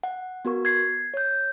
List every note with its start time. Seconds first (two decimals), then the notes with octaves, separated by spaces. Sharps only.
0.03 F#5
0.45 B3 F#4 A#4 C#6
0.65 G#6 C7
1.14 C#5 G6